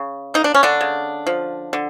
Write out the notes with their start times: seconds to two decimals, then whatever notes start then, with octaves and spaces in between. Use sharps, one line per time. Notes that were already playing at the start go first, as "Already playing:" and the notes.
Already playing: C#3
0.34 A#3 D#4
0.44 D4
0.54 C#4
0.63 D3 D4
0.81 C#3
1.27 F3
1.73 D3